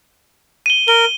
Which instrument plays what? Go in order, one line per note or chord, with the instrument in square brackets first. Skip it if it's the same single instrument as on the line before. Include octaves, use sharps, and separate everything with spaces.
[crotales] D#7 G7
[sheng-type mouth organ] A#4 [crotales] G7